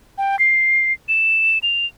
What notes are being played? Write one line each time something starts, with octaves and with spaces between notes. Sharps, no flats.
G5
C7
E7
F7